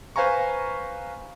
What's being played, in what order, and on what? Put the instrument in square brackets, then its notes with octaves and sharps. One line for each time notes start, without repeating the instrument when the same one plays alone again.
[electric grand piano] B4 C5 F5 G#5 A#5 C#6